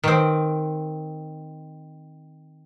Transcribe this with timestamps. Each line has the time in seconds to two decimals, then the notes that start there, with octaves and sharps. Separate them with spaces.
0.04 D#3 C4